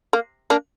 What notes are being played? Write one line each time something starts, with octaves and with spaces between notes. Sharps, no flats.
A#3
A#3 D4